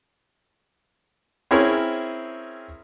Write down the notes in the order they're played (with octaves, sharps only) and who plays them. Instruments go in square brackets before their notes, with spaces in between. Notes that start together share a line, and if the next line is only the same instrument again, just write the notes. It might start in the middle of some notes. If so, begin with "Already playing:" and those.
[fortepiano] C4 C#4 E4 G#4 A#4 C#5